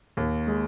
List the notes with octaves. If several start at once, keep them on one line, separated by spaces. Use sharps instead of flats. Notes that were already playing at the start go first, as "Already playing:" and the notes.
D#2
G#3